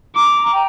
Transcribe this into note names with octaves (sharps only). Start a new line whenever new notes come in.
A#5 D6
G5